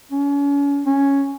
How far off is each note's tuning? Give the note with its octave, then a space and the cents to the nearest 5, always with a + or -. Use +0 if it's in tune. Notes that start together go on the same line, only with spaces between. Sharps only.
C#4 +35
C#4 +0